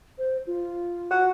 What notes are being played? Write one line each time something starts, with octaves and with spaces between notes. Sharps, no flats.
C5
F4
F#4